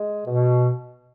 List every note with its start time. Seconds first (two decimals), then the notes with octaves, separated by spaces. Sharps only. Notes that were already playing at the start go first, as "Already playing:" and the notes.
Already playing: G#3
0.26 B2